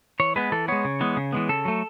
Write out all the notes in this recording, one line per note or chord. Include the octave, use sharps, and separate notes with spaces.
E3 C#5
G#3 B3 B4
E3 A4
G#3 B3 C#5
C#3
E3 G#3 B3
C#3
E3 G#3 B3
C#3 A4
F#3 A3